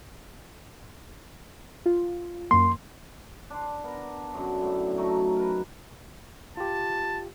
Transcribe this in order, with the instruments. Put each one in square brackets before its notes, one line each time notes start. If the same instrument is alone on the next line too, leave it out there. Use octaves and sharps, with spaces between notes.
[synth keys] F4
[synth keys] F#2 A#3 [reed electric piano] C6
[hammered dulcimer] D4 C6
B3 A#4
F#2 D3
A2
F#3 A3 D#4
A#4 B4
[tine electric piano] F4 G4 [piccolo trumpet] A5